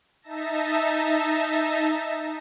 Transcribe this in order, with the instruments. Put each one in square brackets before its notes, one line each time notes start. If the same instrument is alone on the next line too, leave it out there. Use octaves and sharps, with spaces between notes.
[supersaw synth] D#4 E5 A5 A#6